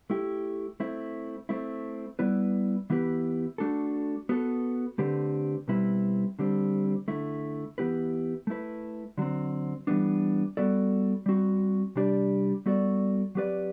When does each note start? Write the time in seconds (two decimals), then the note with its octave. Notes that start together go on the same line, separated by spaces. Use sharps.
0.10 A3 E4 G4
0.80 A3 C4 E4
1.49 A3 C4 E4
2.19 G3 B3 E4 B4 D5
2.90 E3 B3 E4 G4 B4
3.58 A3 D4 F#4 A4
4.29 B3 F#4 A4
4.98 D3 A3 C4 G4 B4
5.68 B2 G3 C4 E4 B4
6.39 D3 G3 C4
7.08 D3 A3 E4
7.78 E3 B3 E4 G4 B4
8.47 A3 E4 B4
9.18 D3 F#3 C4
9.87 E3 G3 B3 D4
10.57 G3 B3 F#4 A4 D5
11.26 G3 C4 F#4
11.96 C3 G3 D4 G4 D5
12.66 G3 B3 F#4 A4 D5
13.35 F#3 C4 G4 B4 D5